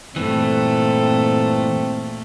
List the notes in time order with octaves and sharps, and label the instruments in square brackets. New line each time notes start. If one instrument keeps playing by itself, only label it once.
[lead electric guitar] G2 E3 [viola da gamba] A#2 A3 [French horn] C4